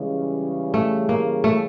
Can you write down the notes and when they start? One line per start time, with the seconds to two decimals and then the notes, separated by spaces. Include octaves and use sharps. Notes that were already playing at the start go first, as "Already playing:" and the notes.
Already playing: C#3 E3 G3 G#3
0.74 A3
1.09 A#3
1.44 A3